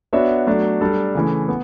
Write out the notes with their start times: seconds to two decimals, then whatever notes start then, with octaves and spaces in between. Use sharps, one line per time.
0.13 B3 D4 F#4 C#5 E5
0.47 F#3 A3 D4
0.81 G3 D4 A4
1.15 C#3 E3 A3
1.48 B3